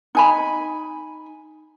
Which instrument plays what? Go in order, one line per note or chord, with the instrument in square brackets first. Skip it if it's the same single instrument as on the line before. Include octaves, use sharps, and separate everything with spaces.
[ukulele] D#4 G#5 B5